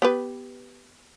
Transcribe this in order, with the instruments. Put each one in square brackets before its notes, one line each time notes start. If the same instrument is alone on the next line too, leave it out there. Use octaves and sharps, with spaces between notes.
[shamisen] B3 G4 B4